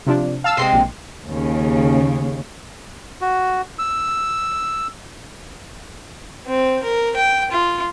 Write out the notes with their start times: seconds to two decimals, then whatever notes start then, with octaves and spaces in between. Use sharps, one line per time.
0.06 C3 F3 D4
0.44 F5 A5 E6
0.57 C3 G#3 C4 C6 C7
0.73 A#1
1.28 D#2 C#3
3.21 F#4
3.79 E6
6.47 C4
6.83 A#4
7.16 G5
7.51 F4